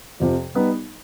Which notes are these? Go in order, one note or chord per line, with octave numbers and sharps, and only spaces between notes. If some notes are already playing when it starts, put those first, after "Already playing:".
F2 C3 F3
G3 B3 D#4